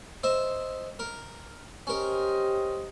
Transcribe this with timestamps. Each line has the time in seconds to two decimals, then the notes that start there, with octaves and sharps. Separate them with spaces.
0.23 C5 D#5 E5
0.99 A#4
1.87 C#4 G4 A#4 C5 D#5